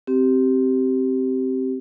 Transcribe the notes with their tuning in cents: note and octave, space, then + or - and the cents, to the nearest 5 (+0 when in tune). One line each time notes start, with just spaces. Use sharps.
C4 +0 G4 -20